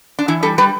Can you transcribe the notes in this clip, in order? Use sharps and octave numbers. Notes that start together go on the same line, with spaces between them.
D4
E3 E4
G3 A4
G3 B4